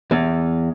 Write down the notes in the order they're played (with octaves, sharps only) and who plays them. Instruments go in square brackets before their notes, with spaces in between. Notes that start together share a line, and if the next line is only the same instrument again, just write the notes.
[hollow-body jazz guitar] E2